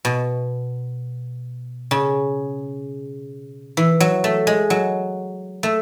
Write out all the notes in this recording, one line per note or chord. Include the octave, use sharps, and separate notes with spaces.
B2
C#3
E3
F#3
A3
G#3
F#3
A3